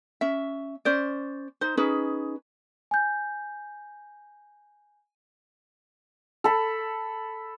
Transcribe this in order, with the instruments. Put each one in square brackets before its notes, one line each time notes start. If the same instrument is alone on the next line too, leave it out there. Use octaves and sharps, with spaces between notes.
[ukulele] C#4 E5
C#4 C5 D5
D#4 C5
C#4 D#4 G#4 B4
[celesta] G#5 G6
[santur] A4 B5